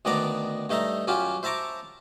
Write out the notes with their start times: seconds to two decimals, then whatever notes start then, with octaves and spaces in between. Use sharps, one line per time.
0.05 D2 D#3 B3 D5 A5 A#5
0.69 G2 A3 D#4 E5 A#5
1.07 F#2 F#3 C#4 F4 G4
1.43 C5 E5 A5 A#5 C#6 D6